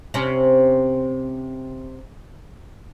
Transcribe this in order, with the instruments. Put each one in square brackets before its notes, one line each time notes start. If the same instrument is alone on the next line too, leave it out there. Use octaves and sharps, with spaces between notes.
[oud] C3 C#4